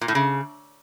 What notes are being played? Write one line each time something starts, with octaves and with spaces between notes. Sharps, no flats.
A#2
A2
C#3